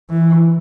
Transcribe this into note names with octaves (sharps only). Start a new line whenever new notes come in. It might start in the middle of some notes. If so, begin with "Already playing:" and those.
E3